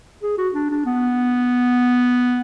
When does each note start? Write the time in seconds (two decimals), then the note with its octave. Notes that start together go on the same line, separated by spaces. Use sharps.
0.23 G#4
0.38 F#4
0.54 D4
0.71 D4
0.86 B3